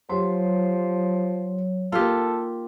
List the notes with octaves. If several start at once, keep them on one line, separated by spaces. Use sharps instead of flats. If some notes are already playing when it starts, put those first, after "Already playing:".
F3 F#3 G4 C#5 C6
A#3 D#4 F4 G4 A4